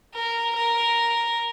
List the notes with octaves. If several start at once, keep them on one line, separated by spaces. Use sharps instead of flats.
A#4
A#4